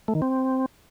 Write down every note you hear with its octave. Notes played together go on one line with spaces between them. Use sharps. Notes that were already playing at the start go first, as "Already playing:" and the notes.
A3
D#3
C4